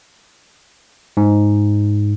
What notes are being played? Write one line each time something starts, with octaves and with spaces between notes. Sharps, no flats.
G#2